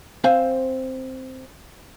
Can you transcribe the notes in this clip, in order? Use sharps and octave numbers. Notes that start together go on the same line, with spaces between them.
C4 C5 F5 G#5